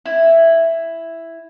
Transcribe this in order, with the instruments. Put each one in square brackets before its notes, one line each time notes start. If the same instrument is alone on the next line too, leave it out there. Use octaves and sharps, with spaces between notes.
[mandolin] E4